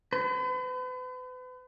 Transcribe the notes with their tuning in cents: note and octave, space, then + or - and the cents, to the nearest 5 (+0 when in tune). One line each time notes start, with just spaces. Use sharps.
B4 +40